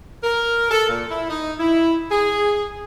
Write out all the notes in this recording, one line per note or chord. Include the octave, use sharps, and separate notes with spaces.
A#4
A4
A#2
E4
D#4
E4
G#4